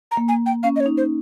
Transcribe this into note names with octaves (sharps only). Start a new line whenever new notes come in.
A#5
A#3
G#5
G5
C#4 F5
D#5
C#5
D#4
C5